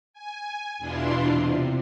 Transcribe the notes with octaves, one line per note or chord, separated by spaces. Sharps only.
G#5
E2 B2 D4 E4 F4 C6
C3